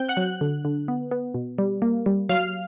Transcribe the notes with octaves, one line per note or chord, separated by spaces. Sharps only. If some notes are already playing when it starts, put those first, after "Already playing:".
Already playing: C4 G5 G6
F#5 F#6
F#3
D3
D3
B3
B3
B2
G3
A#3
G3
F#3 F5 F6